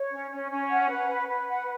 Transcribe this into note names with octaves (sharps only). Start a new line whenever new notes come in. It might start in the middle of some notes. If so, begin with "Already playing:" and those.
Already playing: C#5
C#4
C#4
C#4
F#5
B4
B4
B4
F#5